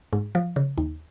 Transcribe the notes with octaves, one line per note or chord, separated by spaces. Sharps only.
G#2
F3
C#3
D#2